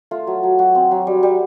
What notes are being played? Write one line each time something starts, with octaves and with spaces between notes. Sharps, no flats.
A3 F4
F#3
F#3
F#3 F#4
C4
F#3
G3
G3